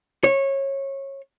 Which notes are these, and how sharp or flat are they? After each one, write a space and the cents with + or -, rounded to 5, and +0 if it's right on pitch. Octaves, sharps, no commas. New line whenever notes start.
C#5 -20